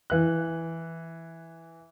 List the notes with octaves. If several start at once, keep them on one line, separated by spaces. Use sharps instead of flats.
E3 F#6